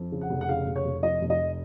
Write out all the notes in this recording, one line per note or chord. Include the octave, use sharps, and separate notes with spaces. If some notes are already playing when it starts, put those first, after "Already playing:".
Already playing: F2
C#3
F#5
F1
F#5
C#3 F5
F1
C#5
F1
F2 D#5
F1
D#5